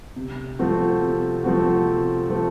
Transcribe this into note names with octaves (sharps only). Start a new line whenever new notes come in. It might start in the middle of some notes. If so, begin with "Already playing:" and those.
C3
F3 A3 C4 F#4
C3
F3 A3 C4 F#4
C3
F3 A3 C4 F#4